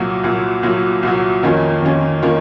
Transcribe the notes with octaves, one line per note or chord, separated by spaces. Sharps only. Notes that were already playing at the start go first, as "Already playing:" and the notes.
Already playing: C2 A#2 F#3
C2 A#2 F#3
C2 A#2 F#3
C2 A#2 F#3
F2 D#3 A#3 C#4 F4
F2 D#3 A#3 C#4 F4
D#3 A#3 C#4 F4